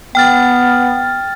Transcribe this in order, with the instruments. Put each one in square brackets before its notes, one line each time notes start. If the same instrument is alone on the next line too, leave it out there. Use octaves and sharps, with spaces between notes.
[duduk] B3 [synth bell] G5 F6 A6